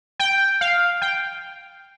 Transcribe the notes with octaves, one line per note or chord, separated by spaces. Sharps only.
G5
F5
G5